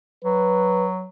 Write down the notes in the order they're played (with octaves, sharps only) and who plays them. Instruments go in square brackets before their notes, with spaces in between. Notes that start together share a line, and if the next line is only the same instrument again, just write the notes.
[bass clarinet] F#3 [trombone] B4